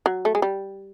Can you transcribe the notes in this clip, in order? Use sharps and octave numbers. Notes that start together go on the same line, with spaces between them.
F#3
A3
G#3
G3